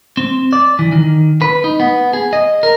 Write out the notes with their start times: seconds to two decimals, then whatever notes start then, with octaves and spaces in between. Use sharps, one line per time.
0.17 C4
0.53 D5
0.79 E3
0.92 D#3
1.42 B4
1.64 D#4
1.80 B3
2.13 G#4
2.33 D#5
2.63 A#4